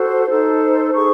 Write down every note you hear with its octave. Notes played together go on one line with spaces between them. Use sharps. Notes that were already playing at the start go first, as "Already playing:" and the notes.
Already playing: F#4 A4 C5
D#4 A4 C5
D#4 G#4 C5 C#6